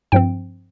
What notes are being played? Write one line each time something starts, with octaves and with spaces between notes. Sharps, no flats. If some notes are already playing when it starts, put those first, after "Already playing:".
G2 F3 C4 G5